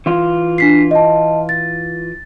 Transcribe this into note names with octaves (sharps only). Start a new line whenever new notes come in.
E3 F4
D4 B6 C7
D#5 A5
A6